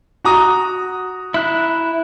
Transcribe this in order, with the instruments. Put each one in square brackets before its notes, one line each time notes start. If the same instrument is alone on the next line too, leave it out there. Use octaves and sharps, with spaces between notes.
[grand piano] F#4 A#5 D#6
[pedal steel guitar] E4 F#6